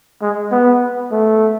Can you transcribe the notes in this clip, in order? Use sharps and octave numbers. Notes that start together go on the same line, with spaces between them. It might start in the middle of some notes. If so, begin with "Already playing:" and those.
G#3
B3
A3